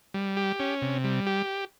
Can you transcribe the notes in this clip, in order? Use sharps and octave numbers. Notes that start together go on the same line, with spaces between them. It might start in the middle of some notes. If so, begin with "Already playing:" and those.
G3
G4
C#4
C3
G3
G4